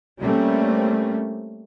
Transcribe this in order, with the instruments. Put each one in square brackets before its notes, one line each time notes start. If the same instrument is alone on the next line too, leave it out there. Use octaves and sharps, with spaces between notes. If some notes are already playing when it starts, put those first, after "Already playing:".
[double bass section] G3 A3 A#3 C4 C#4